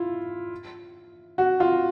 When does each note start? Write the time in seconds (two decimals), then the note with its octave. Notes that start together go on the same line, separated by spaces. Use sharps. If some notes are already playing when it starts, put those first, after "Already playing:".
Already playing: E4 F4
1.38 F#4
1.60 F4